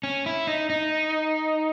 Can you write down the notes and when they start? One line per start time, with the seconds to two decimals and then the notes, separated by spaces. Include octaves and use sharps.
0.03 C#4
0.26 E4
0.47 D#4
0.70 D#4